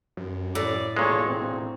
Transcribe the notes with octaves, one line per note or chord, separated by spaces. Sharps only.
F#2
A2 D5
E1 A#2 G#3 A4 C#5
C4